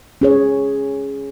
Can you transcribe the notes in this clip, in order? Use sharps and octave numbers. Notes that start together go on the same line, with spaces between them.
C#4 G#4 C#5